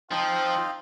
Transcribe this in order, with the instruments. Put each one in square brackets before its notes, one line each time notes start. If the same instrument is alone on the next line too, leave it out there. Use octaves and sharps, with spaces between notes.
[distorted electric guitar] F3 [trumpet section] C4 F4 [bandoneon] D#4 D#5 F5 [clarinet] G5